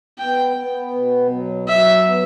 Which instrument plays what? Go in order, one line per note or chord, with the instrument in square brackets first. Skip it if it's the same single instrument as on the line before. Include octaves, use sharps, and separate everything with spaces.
[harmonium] B3 [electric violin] G5
[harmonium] B3
B2
F#3
[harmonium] F#3 [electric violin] E5
[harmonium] B3